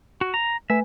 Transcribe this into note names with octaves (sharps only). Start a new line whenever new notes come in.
F#4
A#5
A3 B4 E5 G#5